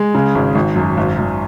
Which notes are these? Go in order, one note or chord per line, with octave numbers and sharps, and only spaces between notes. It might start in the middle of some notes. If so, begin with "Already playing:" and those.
Already playing: G#3
C#3
G#1
G#1
F#2
G#1
G#1